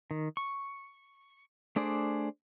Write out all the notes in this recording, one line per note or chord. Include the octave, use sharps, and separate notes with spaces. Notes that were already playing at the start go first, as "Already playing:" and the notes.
D#3
C#6
A3 D4 G#4 C5 D5